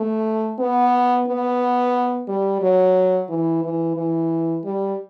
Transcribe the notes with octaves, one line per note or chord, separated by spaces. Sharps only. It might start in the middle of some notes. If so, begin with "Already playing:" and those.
Already playing: A3
B3
B3
G3
F#3
E3
E3
E3
G3